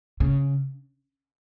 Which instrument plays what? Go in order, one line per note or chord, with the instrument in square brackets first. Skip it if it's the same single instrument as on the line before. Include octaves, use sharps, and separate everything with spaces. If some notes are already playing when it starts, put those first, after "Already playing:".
[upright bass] C#3